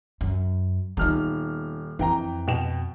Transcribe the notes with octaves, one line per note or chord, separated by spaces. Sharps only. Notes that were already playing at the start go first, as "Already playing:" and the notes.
F#2
D#1 B3 D#4 F6
F2 E3 G5 A#5
B2 G5 E7